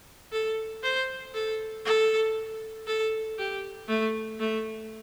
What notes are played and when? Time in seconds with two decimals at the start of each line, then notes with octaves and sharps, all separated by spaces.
0.32 A4
0.83 C5
1.34 A4
1.85 A4
2.87 A4
3.38 G4
3.88 A3
4.40 A3